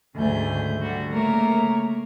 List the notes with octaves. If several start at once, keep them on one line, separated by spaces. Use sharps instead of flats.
D2 G#2 C#3 A3 G#4 G6
D3 G3 F#4
C#3 A3 A#3 A#4 C#5 A#5